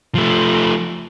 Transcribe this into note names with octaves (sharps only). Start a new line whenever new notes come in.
F3 A3